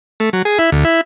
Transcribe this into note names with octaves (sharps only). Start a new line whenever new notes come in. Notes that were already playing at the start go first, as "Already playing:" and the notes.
A3
F#3
G#4
E4
D2
E4